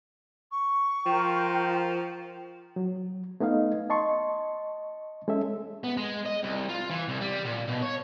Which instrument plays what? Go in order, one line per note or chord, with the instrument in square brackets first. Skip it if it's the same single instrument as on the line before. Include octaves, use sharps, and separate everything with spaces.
[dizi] C#6
[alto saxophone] F3 [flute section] F4 A#4 G5
[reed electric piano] F#3
A3 B3 D#4 D#5 F5
D#5 A5 C6 C#6
G#3 C#4 A4 E5
[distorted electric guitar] B3
G#3
D#5
C2
F4
E3
C2
G3
A#2
B2
C#5